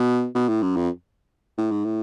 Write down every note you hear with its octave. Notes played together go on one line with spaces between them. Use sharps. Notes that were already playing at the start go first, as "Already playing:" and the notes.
Already playing: B2
B2
A2
F#2
F2
A2
G#2
A2